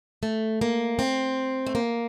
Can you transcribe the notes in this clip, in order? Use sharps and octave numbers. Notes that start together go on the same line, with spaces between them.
A3
A#3
C4
A3
A#3